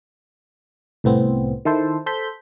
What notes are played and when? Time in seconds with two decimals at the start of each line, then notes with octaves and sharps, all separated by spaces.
1.04 C2 A2 B3 C4
1.65 D#3 E4 A4 C5
2.06 A4 C5 G6 B6